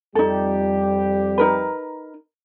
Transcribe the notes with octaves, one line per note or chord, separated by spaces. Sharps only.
F2 G3 D#4 G4 A4
D#4 A#4 B4